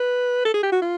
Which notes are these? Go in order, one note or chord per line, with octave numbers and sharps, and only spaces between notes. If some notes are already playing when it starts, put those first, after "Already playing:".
Already playing: B4
A4
G#4
G4
F#4
F4